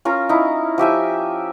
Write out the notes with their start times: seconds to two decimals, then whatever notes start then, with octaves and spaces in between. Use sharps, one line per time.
0.05 C#4 F4 A#4
0.29 D#4 E4
0.78 F3 G4 E5 G#5